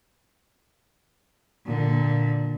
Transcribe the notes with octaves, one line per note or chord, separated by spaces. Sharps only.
A#2 D3